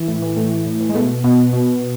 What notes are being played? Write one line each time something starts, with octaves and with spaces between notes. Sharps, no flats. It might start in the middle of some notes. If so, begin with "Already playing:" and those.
Already playing: E3
A2
E3
A2 A3
E3
A2
E3
G#3
B2 A3
B2 B3
B2